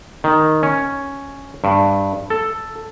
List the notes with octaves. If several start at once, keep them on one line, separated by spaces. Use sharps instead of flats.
D#3
C#4
G2
A4